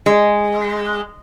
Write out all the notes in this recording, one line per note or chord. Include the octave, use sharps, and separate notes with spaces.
G#3